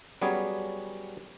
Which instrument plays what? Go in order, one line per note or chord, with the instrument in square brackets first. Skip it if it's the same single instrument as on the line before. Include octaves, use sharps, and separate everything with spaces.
[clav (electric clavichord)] F#3 G3 B3 C#4 G#4 C#5